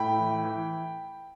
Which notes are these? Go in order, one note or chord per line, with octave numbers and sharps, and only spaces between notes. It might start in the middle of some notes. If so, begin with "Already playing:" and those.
Already playing: A2 G5 B5
E3
E3